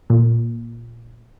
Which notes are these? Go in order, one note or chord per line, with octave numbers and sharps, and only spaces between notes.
A#2